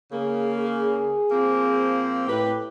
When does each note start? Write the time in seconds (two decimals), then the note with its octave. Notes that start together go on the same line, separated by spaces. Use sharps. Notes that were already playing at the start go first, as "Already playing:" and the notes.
0.12 C#3 A#3 G#4
0.60 G#4
1.31 F3 A#3 C4
2.27 A2 G4 B4